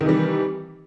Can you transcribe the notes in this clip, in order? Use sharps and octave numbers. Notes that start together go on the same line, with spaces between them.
C3 D#3 E3 G3